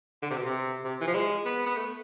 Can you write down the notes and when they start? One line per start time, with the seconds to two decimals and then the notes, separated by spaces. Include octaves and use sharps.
0.22 D3
0.30 C3
0.38 B2
0.45 C3
0.84 C3
1.00 E3
1.07 F3
1.15 G#3
1.45 B3
1.66 B3
1.77 A3